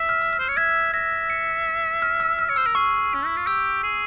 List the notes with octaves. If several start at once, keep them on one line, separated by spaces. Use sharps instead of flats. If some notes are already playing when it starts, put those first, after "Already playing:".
Already playing: E5
F6
E6
F6
C5
C#5
E5 G#6
E5 A#6
C#7
F6
E6
F6
C#5
C5 E6
A#4
G#4 C#6
C#4
E4
F4
G4 E6
G#4